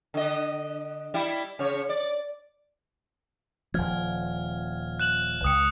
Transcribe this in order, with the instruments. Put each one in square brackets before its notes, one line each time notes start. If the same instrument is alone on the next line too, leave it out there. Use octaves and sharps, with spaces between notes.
[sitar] D3 D#5
G3 E4
C#3 C#5
D5
[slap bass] D#1 F3 [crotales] F6 G#6
[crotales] F#6 E7 F#7
[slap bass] C#2 [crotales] D#6 C#7